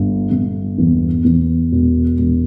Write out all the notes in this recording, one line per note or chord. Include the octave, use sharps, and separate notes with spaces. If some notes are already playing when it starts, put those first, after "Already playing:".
Already playing: G1
G1
E2
E2
E1
E1